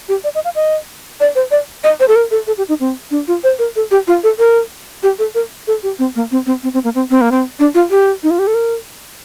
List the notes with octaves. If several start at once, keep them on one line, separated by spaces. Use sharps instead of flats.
G4
D5
D#5
F5
D#5
D5
C5
D5
D#5
C5
A4
A#4
A4
A4
G4
D#4
C4
D4
F4
C5
A#4
A4
G4
F4
A4
A#4
G4
A4
A#4
A4
G4
C4
A#3
C4
C4
C4
C4
A#3
C4
C4
A#3
C4
D4
F4
G4
D#4
F4
G4
A4
A#4